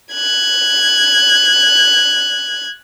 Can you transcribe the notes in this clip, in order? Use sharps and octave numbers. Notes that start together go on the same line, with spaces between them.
F#6 G#6